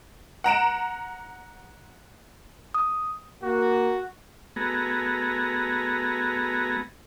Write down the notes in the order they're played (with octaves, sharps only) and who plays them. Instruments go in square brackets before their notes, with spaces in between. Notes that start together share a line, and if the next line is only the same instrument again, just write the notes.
[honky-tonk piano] F#5 A#5 D7 E7
[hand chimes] D#6
[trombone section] A#3 [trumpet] F#4
[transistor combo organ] A3 B3 F#4 G#4 A#5